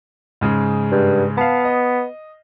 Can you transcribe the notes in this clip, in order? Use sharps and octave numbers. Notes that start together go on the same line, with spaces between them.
G#2 C#3 G#3
G2
B3 F5 A5
D#5